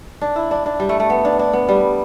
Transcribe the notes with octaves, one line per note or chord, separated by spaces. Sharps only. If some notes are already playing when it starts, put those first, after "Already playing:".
D4
E4
D4
D4
G3
A3
A3
B3
D4
D4
B3
G3